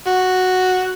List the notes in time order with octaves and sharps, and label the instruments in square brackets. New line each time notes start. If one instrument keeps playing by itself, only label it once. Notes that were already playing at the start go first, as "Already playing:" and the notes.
[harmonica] F#4